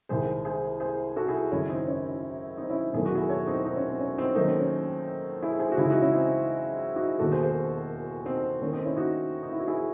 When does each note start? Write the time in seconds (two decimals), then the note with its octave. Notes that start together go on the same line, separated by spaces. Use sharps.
0.09 C2 C3 D#3 G#3 G#4 C5
0.45 G#4 C5
0.80 G#4 C5
1.16 F#4 A4
1.27 E4 G#4
1.51 G#1 F#2 C#3 C#4 E4
1.70 C4 D#4
1.88 C#4
2.58 C4 D#4
2.70 C#4 E4
2.93 E1 E2 D#3 F#3 A3 G#4
3.05 F#4
3.15 E4 G#4
3.29 A4 C#5
3.47 C4 D#4
3.64 C4 D#4
3.77 C#4
3.89 C4
4.00 C#4
4.18 C4 D#4
4.35 D#2 D#3 F#3 A3 C4 D#4
4.47 C#4
4.60 C#4
5.42 E4 G#4
5.59 G#4 C5
5.72 F#4
5.77 C#2 C#3 E3 G#3 E4 G#4
5.90 D#4 F#4
6.02 C#4 E4
6.13 C4 D#4
6.96 D#4 F#4
7.19 E1 D#2 D#3 F#4 A4
7.32 G#4 C5
7.43 G#4 C5
8.26 C4 D#4
8.61 D#2 D#3 A3 C#4
8.73 C4 D#4
8.85 C#4 E4
8.97 D#4 F#4
9.43 D#4
9.52 E4
9.60 F#4
9.68 E4 G#4